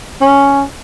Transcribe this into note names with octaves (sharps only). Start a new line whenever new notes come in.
C#4